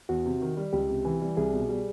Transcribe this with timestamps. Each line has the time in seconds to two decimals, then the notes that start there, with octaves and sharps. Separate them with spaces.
0.09 E2 F#4
0.25 C3
0.41 D#3
0.57 G3
0.73 C#2 G4
0.89 C3
1.05 E3
1.21 G3
1.37 C2 G#4
1.53 B2
1.69 G3